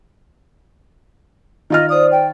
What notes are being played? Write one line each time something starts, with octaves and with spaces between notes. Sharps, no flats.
D#3 F4 D#5 F6
C5 D5 D#6
G5